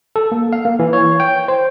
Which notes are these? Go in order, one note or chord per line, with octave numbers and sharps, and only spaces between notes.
A4
A#3
F5
A#3
E3
C#5
G5
C5